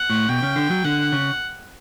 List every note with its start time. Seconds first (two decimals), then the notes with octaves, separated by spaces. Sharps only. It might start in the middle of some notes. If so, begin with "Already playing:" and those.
Already playing: F#5
0.10 A2
0.29 B2 G5
0.42 C#3
0.56 D3
0.70 F#3
0.84 D3 F#5
1.12 C#3